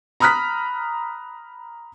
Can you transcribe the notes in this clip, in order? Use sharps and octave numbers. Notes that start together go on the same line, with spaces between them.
A#5 B5 D#6 F6 F#6 B6